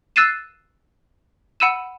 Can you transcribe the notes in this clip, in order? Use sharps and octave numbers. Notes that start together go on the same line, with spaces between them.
E6 F#6 A6 C7 D#7 E7
F#5 B5 E6 D#7 E7